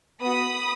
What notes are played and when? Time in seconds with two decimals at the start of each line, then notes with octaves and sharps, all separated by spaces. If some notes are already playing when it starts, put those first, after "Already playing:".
0.21 B3 F#4 B5 D#6